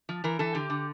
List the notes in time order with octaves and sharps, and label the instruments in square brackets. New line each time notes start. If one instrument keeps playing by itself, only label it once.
[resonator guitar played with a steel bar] F3
E3 A#4
E3 A4
D3 G4
D3